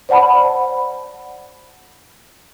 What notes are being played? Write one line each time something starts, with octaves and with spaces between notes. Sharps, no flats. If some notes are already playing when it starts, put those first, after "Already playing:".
C5 D5 F#5 A5 B5